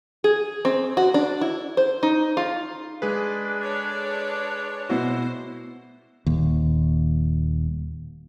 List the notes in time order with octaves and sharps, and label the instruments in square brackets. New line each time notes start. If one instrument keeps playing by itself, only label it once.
[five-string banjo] G#4
C4
F#4
D4
E4
C5
D#4
F4
[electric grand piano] G#3 G#4 B4 [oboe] D4
[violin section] A4 C#5 D5
[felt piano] B2 E4 F#4 [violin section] C5
[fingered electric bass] D#1 D#2